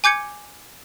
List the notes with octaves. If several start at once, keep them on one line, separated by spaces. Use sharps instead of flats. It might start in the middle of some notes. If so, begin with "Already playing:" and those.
G#5 D6 G6 G#6 C#7